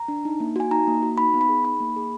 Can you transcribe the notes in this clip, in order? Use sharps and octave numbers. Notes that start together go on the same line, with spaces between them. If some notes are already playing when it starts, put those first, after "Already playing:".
Already playing: A#5
D4
D#4
A#3
F#4 G#5
D#4 A#5
A#3
F#4
D#4 B5
B3
B5
G#4
D#4 B5
A#3
G#4